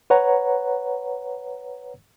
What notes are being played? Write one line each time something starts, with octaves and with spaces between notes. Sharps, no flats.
B4 C#5 F#5 A#5